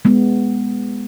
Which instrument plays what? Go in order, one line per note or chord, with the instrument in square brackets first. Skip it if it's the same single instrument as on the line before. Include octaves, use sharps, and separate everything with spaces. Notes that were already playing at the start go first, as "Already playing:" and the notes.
[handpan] G#3 B3